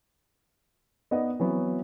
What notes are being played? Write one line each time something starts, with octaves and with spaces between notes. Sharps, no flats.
B3 D#4 B4 D5 D#5 F#5
E3 F#3 B3 C4